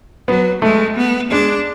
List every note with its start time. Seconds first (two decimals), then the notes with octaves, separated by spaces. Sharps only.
0.28 F#3 B3
0.62 G#3 A3
0.97 B3
1.31 G#3 D4